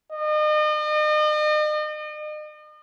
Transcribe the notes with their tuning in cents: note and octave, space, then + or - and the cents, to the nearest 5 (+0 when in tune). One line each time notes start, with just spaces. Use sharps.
D#5 -40